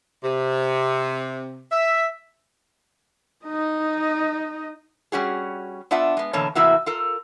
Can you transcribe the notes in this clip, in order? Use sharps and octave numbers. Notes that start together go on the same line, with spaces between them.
C3
E5
D#4 D#5
G3 C#4 F#4 G#4
B3 D4 F4 E5 F#5
G#3 B3
B2 D3 E3 A#3 C#5 A5
A2 C3 E3 A#3 E4 F#4
F4 A4 A#4